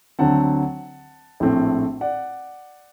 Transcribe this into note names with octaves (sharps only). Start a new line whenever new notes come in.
D2 D3 F#3 C4 F#5 A5
A#1 A2 A3 C4
D5 F#5